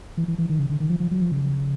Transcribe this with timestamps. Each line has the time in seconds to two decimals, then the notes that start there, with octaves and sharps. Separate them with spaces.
0.17 E3
0.28 E3
0.38 E3
0.49 D#3
0.59 C#3
0.70 D3
0.80 D#3
0.90 F3
1.00 F3
1.11 F#3
1.22 F3
1.32 C#3